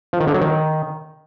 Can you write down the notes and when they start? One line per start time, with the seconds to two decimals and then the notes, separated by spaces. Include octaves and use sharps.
0.13 F3
0.20 D#3
0.27 D3
0.34 F#3
0.41 D#3